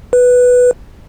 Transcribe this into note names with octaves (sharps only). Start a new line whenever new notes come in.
B4